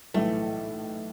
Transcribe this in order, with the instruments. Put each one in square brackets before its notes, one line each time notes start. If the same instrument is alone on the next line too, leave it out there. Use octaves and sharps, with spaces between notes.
[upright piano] B1 A2 E3 [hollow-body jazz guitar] A3